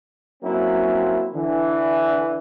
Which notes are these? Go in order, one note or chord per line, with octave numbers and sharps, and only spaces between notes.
F#3 A#3 C4 C#4 E4
D3 E3